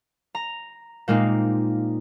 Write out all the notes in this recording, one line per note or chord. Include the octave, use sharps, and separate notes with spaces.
A#5
A#2 G#3 A#3 C4 D#4